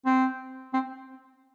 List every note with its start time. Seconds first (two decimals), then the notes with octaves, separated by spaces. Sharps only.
0.05 C4
0.74 C4